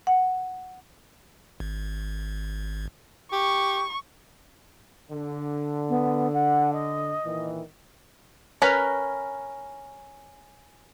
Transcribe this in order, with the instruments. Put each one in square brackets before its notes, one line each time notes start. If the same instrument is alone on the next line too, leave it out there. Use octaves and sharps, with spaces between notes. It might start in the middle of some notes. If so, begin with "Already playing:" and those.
[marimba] F#5
[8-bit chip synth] G#1
[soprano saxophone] G4 [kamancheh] C#6
[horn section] D3
[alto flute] B3
F#5
D#5
[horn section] A#2 D#3 E3
[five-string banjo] C#4 A#4 B4 A#5 B5